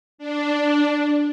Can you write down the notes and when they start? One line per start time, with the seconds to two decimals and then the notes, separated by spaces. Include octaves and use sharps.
0.18 D4